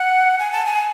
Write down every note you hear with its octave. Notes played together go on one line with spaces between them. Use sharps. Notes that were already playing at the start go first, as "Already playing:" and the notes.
Already playing: F#5
G#5
A5
G#5